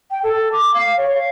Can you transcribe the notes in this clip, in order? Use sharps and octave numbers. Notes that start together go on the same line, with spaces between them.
G5
A4
D6
F5
C#5
F5